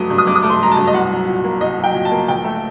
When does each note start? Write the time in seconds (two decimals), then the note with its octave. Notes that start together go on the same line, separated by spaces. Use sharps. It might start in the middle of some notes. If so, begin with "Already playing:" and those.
Already playing: G2 F#3 A3 D6 D#6
0.10 G2
0.18 D#6
0.27 G2 D6
0.36 D#6
0.42 A3 D6
0.50 C6
0.61 F#3 A#5
0.72 A5
0.77 G2
0.87 D#5
0.93 C2 F#5
1.11 F#3
1.27 A#2
1.44 A#3
1.61 C2 D#5
1.79 F#3
1.84 G5
1.94 A#2
2.05 A5
2.12 A#3
2.28 A#1 G5
2.44 A3